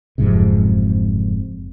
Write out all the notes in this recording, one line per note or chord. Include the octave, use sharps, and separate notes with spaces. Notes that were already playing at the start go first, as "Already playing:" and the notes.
F#1 F2 G#2 C3